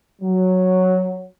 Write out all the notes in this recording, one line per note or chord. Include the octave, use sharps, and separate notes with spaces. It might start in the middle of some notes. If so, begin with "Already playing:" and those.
F#3